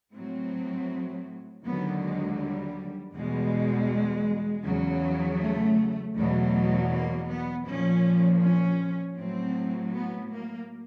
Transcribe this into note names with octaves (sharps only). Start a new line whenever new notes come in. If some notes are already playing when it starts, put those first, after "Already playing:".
A2 F#3 C4
D#2 D3 F#3 B3
G#3
G3
E2 B2 G3 G#3
E2 C#3 F#3
A3
E2 B2 F#3 A3
A#3
B3
A#2 F3 C#4
C#4
A2 F#3 C4
B3
A#3